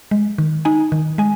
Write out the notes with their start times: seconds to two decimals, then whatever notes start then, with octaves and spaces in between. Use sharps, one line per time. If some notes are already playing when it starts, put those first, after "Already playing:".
0.11 G#3
0.38 D#3
0.65 D#4 G#5
0.92 D#3
1.18 G#3 G#5